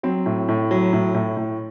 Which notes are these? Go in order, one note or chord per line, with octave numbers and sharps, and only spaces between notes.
F#3 C4
A2
A2
F#3
A2
A2
A2